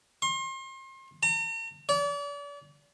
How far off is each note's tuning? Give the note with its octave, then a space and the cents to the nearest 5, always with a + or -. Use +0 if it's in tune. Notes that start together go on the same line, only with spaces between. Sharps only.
C6 +35
A#5 -45
D5 -40